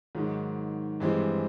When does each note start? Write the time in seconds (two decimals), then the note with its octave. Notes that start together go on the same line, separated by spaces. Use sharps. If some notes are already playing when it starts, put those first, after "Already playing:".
0.15 G#2 D#3 F#3
1.00 G2 E3 G#3 C4 E4